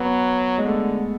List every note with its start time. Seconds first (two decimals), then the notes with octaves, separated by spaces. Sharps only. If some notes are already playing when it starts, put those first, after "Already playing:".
Already playing: F#3 B3
0.58 G#3
0.65 D3 A3